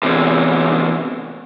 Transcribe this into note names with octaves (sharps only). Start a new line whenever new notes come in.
E2 C3